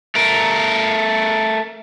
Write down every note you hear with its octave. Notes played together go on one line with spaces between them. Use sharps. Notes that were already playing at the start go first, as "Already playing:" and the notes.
A3 A#4